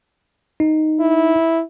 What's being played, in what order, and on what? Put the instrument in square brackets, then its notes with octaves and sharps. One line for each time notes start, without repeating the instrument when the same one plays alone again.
[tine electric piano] D#4
[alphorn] E4